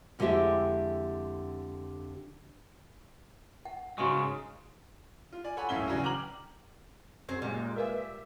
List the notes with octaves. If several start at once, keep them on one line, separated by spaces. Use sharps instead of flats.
F2 D3 G#3 E4 G4 E5
F#5
G#2 C#3 G#3 F#4 C6 C#6
F4
D5 G#5
A4 C#5 F#5 G#5 B5
D#1 A2 C#4 E5 F5 G7
C#3 E3 F#3 C#4 D4
G5 A#5 D6 F6 F#7
F#2 C4 G#4 C5
A#2 G3 G#3
A#4 B4 E5 F5